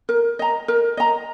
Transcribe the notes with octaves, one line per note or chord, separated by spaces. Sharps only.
A#4
D#5 A#5
A#4
D#5 A#5